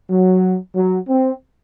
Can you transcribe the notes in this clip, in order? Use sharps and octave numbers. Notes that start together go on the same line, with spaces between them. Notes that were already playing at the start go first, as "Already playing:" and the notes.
F#3
F#3
C4